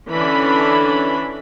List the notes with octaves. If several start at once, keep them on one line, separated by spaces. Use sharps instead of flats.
D3 E3 C#4 D4 B5